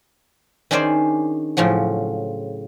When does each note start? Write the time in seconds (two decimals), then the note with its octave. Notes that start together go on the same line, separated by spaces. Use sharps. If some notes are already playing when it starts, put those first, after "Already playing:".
0.71 D#3 C#4 D4 G#4 C5 D5
1.57 A2 C#3 F3 F#3